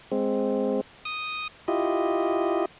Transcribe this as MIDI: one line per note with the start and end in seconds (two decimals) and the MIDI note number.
0.12 0.81 56
0.12 0.81 60
1.05 1.48 87
1.68 2.65 64
1.68 2.65 65
1.68 2.65 67
1.68 2.65 75